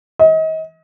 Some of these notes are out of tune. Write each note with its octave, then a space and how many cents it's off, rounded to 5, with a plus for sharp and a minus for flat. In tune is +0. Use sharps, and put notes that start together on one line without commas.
D#5 +35